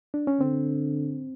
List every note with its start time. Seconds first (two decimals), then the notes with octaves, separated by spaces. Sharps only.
0.14 D4
0.27 C#4
0.40 D3 C4